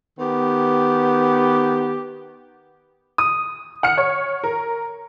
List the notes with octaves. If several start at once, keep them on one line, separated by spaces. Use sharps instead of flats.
D#3 B3 G4
D#6
F#5 F6 C#7
C#5
A#4